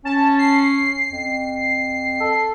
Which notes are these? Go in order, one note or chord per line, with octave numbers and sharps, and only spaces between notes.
C#4 A5
C7
F2
A4